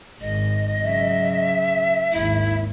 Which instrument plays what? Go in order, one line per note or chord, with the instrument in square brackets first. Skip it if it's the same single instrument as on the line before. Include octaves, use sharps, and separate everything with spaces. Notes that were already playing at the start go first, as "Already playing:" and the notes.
[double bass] G#1 [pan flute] D#5
[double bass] C#3 F#3 [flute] E5
[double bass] G#1 D#2 [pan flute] E4